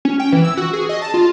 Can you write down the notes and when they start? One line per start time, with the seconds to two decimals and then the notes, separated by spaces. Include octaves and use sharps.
0.05 C#4
0.20 G5
0.32 E3
0.44 E6
0.57 F#4
0.73 G#4
0.89 D#5
1.02 A5
1.14 F4